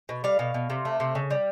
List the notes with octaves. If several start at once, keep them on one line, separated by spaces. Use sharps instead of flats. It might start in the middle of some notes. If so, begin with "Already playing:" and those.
B2
G3 F5
B2
B2
C3
A3
C3
C#3
G3